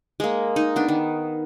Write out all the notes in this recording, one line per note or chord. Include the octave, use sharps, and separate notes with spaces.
G#3 A#3
D#4
B3 D4
D#3